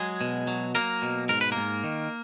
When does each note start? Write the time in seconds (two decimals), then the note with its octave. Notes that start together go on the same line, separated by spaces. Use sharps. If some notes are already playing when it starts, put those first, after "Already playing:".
Already playing: F#3 G#3 G#4
0.21 B2
0.47 F#3
0.75 F#3 A#3 A#4
1.02 B2
1.29 G#2 A#4
1.41 B4
1.52 G#2 A#3 A#4
1.84 D#3